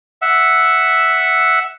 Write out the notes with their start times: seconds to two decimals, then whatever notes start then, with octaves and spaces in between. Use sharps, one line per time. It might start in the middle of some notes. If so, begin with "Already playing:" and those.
0.22 E5 F#5 E6